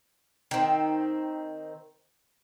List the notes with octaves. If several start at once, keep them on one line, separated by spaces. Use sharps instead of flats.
D#3 C4